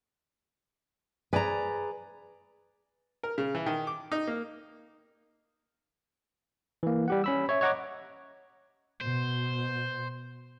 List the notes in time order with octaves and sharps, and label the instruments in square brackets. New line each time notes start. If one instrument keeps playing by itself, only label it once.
[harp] G#4 B4 D5 [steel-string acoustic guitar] G#5 A#5
[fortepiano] A#4
C#3
E3
D#3
D6
D#4
A#3
[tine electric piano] E3 A#3
G3 G4 F#5
C#4 B5 E6
C#5 E5
C#5 D#5 F#5 A#5 C#6 D6
[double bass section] B2 [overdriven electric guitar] C5